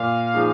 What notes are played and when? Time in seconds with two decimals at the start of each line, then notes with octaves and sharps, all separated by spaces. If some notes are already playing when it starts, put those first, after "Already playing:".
Already playing: A#2 F5
0.34 F3 G#3 D#4 G#4